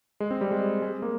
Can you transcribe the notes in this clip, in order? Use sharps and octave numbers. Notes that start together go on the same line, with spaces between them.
G#3
C4
G3
G#3
G#3
A#3